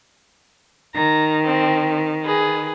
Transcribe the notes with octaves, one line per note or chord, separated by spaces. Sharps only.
D#3 A#5
C4
G#4 B4